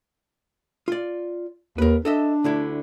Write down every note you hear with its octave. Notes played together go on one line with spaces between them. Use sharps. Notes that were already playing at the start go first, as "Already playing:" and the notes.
F4 D5
D#2 A#4 B4
D4 A4 D#5 E5
D2 D3 E4